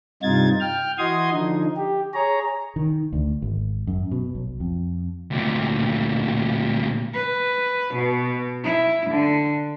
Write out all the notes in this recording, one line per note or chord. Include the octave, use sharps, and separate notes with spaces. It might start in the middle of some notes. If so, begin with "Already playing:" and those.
G2 C3 D#4 F4 G#6 A6
G5 F6
E3 F#4 D#5 C6 D#6 G#6
D3 F3 D#4
G4
G#4 C#5 A#5
D#3
D2
G#1
F#2
B2
B1
F2
D2 A#2
B4
B2
E4
D3